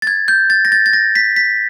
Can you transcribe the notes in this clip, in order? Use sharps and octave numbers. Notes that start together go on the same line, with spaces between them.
A6
G#6
G6
A6
A#6
A6
A6
A#6
B6
B6